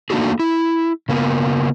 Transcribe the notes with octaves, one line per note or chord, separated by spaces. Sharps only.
A3 A#3 D4 D#4 F#4 G#4
E4
C#3 A#3 B3